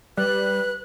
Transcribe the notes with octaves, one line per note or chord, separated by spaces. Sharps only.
G3 B4 F#6